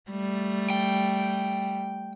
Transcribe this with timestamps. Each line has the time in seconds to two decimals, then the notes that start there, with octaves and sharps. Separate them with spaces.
0.10 G3 A3
0.70 G5